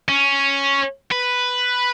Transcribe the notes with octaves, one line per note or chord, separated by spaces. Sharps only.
C#4
B4